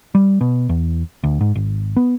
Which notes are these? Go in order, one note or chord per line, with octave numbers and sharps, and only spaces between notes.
G3
B2
E2
D2
G#2
G#1
B3